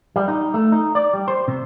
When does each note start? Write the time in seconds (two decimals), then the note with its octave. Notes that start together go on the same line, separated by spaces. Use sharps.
0.16 G3
0.28 D#4
0.54 A3
0.72 D#4
0.95 D5
1.14 G3
1.28 C5
1.48 C3